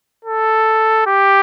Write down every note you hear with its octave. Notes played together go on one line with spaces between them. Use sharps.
A4
G4